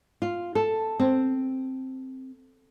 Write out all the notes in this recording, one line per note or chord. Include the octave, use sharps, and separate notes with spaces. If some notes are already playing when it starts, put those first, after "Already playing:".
F4
A4
C4